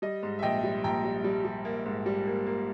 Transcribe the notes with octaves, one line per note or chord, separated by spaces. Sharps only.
G3 D#5
G#2
E5
A#1 D#5 G5
G3
A#1 G5 A#5
G3
G3
G3
A#3
G#2
G3
A#3
A#3